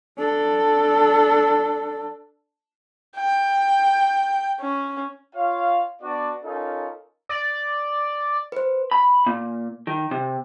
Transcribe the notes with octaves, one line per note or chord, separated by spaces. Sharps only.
D4 A4
G5
C#4
F4 C#5 F5
B3 D4 F#4 D5
C#4 D#4 F4 A4 A#4
D5
B4 C5
B5
A#2
D#3
C3